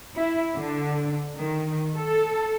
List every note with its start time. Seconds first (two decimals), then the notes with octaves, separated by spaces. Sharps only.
0.16 E4
0.54 D3
1.36 D#3
1.96 A4